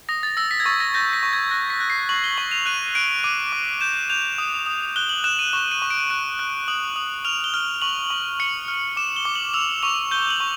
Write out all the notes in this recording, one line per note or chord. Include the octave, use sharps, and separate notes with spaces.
D#6 A#6
A6
E6 A#6
B6
G#6
C#6 A6
A#6
G6 A#6
B6
C#6
G#6
F#6 A#6
B6
F#6
C7
C#6 F#7
G7
C#6 F#7
F7
F#6 D#7
F#6 D7
D6 D#7
D6
G6 E7
G6 F7
D#6
D#6
F#6 G7
F#7
F#6 E7
D#7
C#6 E7
D#7
C#6
D7
F#6 D#7
F#6
D#6 F#7
D#6
F6 F7
G7
F6
C#6 F#7
C#6
F6 C#7
F6
D6 E7
G7
D6
F#7
E6 F7
C#6 F7
G6 G7
F#7
C#6